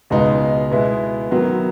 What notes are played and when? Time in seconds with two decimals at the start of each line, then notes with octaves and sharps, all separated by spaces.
0.10 C#2 B2 G#3 B3 D#4
0.71 B2 G#3 B3 E4
1.31 D#3 F#3 B3